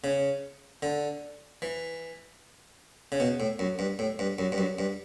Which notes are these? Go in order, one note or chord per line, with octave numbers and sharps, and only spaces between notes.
C#3
D3
E3
C#3
B2
A2
F#2
G2
A2
G2
F#2
G2
F#2
G2